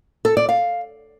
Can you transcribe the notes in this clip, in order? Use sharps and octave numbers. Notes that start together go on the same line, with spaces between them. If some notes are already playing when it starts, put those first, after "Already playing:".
A4
D5
F5